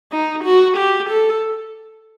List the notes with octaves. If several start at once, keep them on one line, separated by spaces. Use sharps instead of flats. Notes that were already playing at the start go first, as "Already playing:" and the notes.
D#4
F#4
G4
A4